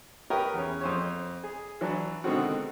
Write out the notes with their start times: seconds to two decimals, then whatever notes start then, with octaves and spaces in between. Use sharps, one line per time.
0.30 G4 A#4 B4 C#5 D#6
0.54 E2 C#4
0.81 F2 C5 C#5
1.44 G#4
1.81 E3 F#3 D4
2.24 B2 D3 D#3 G#3 C4 F#4